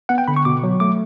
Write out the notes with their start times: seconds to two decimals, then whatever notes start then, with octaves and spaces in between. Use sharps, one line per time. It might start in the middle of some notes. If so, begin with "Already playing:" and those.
0.09 B3 F#5
0.18 G5
0.28 D3 B5
0.36 C#6
0.45 B2 D6
0.63 F#3
0.80 A3 D6